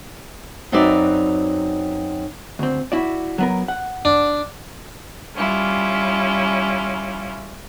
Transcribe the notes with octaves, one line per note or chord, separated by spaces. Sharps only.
F#2 C4 D#4 F#4 B4 D5
D2 C4
E4 F#4 D5
F#3 B3 A#4
F#5
D4
G3 C#4 E4 F4